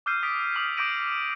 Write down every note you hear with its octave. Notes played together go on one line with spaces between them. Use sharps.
D6 E6 F6 G6 C7 D#7
D#6 A6 B6 D7
D6 D#6 F6 D#7 F7 F#7
D6 D#6 G6 A#6 D7 D#7